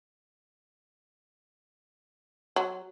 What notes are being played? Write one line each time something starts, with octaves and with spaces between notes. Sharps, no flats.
F#3